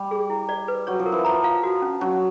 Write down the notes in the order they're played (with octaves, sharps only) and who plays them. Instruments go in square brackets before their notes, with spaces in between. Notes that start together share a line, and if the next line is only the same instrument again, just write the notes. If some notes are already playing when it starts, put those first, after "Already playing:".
Already playing: [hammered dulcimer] G3
[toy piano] G#4
E4
D5
B4
[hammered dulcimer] F#3 [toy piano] C#5
[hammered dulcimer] F3
[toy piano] A#4
[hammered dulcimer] E3
[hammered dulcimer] F3 [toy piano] A#5
[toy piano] F5
F#4
C#4
[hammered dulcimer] F#3 [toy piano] C#4